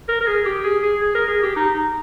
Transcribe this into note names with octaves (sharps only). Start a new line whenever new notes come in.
A#4
A#4
G#4
G4
G#4
G#4
G#4
A#4
G#4
G4
D#4
D#4